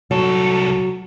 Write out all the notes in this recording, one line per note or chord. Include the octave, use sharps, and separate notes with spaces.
C2 F#3 A4